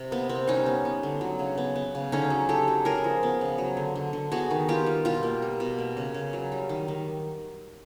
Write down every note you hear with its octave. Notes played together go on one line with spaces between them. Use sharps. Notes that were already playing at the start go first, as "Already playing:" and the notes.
Already playing: C3
A#3 B3
C3 C4
G3 C#4 D#4
B3
B3
D3
F#3
C#3
B3
B3
C#3
D3 C#4 D#4
F#3
F#3 G4 A4
F#3
G#3 G#4 A#4
F3
B3
C#3
F#3
D3
D3
D3
B3 F#4 G#4
D#3
B3 F4 G4
G3
B2 F4 G4
A#3
G3
B2
A#3
C#3
C#3
F#3
G3
D#3
D#3